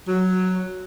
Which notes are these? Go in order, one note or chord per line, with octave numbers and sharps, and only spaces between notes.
F#3